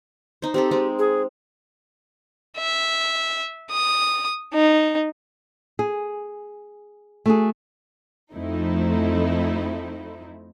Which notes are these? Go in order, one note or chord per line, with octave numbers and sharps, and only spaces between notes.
D#4 C5
C4 D#4 G4 A4
G#3 C4
G#4
E5
D#6
D#4
G#4
A3 F#4 G#4
F2 F3 A3 C4 D#4 E4